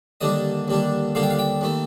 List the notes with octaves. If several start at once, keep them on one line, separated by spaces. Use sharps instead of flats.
D#2 D3 G3 D4 D#5
D#2 D3 G3 D4
D#2 D3 G3 D4 F5
G5
F5
G5
D#2 D#3 A3